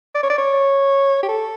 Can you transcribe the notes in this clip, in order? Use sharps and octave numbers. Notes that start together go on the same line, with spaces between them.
D5
C#5
D5
C#5
G4
A4